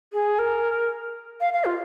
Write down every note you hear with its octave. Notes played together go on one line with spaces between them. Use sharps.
G#4
A#4
F5
F5
F4